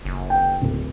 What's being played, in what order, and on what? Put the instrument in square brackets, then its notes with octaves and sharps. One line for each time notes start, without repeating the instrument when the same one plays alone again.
[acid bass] F#1
[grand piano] G5
D1